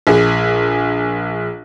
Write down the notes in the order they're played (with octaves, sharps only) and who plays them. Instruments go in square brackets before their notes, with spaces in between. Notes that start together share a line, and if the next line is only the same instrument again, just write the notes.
[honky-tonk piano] A#1 G#4